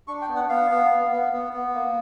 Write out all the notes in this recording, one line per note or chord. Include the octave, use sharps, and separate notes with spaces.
D4 C#6
G5
B3
F#5
B3 F5
B3
B3
B3
B3
B3
A#3